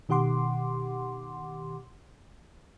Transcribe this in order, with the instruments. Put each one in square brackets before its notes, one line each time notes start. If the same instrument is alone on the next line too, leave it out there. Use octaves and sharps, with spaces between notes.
[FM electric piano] B2 D#3 G4 F#5 C6 D6